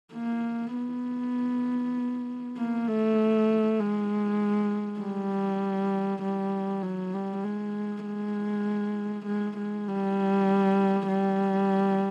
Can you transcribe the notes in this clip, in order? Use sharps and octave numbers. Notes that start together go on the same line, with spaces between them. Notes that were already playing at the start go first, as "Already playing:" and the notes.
A#3
B3
A#3
A3
G#3
G3
G3
F#3
G3
G#3
G#3
G#3
G#3
G3
G3